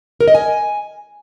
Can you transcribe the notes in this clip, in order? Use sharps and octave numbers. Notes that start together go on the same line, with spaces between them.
A#4
D#5
G#5